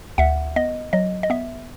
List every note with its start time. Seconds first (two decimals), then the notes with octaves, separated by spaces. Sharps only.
0.18 D2 E5 F#5
0.56 B3 D#5
0.93 F#3 D#5
1.23 D#5
1.30 B3 E5